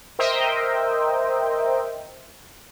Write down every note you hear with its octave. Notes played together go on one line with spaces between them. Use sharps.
A#4 C5 D#5 E5 G5